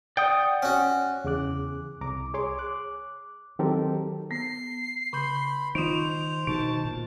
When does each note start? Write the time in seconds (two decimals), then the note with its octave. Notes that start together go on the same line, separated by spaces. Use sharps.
0.17 D5 F#5 G5 D#6
0.63 C#4 F#4
1.24 E2 C#3 G#4 D6 F#6
2.01 C2 A#5 D6
2.34 G#4 C#5 C6 D6
2.59 D6 F#6
3.59 D#3 F#3 C4 G4 A4 A#4
4.31 B3 C7
5.13 C#3 B5 C6 G6
5.75 D#3 D#4 F4 C5 F7
6.47 B2 D3 D#3 D#4 A5
6.85 A#2